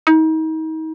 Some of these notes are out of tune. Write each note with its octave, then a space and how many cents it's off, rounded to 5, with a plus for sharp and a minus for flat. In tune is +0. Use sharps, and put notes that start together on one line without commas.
D#4 +35